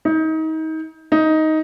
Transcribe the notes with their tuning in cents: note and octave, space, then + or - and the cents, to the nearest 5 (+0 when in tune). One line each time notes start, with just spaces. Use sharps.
D#4 +30
D#4 +10